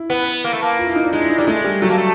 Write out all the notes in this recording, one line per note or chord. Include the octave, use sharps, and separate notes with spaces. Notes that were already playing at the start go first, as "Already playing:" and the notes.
Already playing: E4
B3
A#3
A3
A#3
F4
E4
D#4
D4
G#3 D#4
E4
D#4
G3 D4
G#3 A3
G3
F#3 A3
A#3
A3